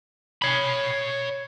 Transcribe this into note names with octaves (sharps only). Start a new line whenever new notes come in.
C#5 B5